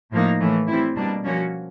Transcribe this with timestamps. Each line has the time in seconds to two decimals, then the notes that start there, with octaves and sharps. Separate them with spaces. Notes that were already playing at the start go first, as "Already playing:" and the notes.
0.11 A2 F3 A#3 D#4
0.40 A2 E3 A3
0.67 G3 C4 E4
0.96 B2 G3 A#3 D4
1.24 F3 A#3 C#4 F#4